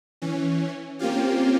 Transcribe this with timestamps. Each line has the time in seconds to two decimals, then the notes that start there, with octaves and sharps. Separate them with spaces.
0.22 E3 C#4
0.99 A#3 C4 C#4 F4 G4